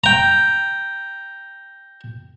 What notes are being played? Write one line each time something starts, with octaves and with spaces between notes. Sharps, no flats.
G5 A#5